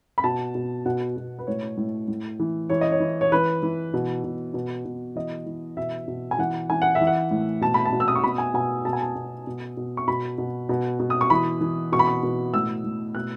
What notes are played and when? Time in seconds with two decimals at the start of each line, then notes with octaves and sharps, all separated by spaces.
0.18 B5
0.24 B2 A5
0.55 B2
0.86 B2 F#5
1.17 B2
1.39 B4
1.47 A2 C#5
1.77 A2
2.08 A2
2.40 E3
2.70 E3 C#5
2.81 D#5
2.92 C#5
3.00 E3
3.21 C#5
3.32 E3 B4
3.63 E3
3.94 B2
4.24 B2
4.54 B2
4.85 B2
5.15 E3 D#5
5.46 E3
5.77 B2 E5
6.08 B2
6.31 G#5
6.38 E3 F#5
6.70 E3 G#5
6.82 F#5
6.95 E5
7.01 E3
7.07 F#5
7.31 A2
7.61 B2 A5
7.74 B5
7.86 A5
7.92 B2
8.00 E6
8.08 D#6
8.15 C#6
8.24 B2 B5
8.38 G#5
8.54 B2 G#5
8.85 B2 A5
8.93 G#5
9.01 A5
9.15 B2
9.47 B2
9.77 B2
9.97 C#6
10.07 B2 B5
10.38 B2
10.69 B2
10.99 B2
11.10 D#6
11.21 C#6
11.30 E3 B5
11.61 E3
11.92 B2 C#6
11.99 B5
12.07 C#6
12.23 B2
12.54 A2 E6
12.84 A2
13.15 B2 F#6